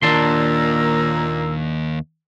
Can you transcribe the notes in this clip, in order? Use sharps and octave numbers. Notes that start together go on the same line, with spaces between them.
D#2 A#2 D4 A#4 A5 C6 E6